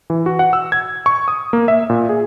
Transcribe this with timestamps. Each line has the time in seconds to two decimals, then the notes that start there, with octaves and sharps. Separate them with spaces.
0.10 E3
0.26 F#4
0.39 F#5
0.53 E6
0.72 G#6
1.06 C#6
1.28 D#6
1.53 A#3
1.68 E5
1.90 A#2
2.09 G#4